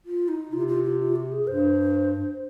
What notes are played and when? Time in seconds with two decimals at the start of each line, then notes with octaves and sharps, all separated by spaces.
0.06 F4
0.28 D#4
0.52 C3 F4
0.68 F4
0.84 F4
0.99 F4
1.16 G4
1.32 G#4
1.47 G2 C5